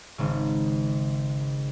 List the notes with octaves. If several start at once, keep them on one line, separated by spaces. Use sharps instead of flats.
G#1 C#3